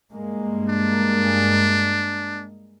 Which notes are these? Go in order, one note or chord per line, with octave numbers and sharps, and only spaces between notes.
G2 G#3 A#3
D4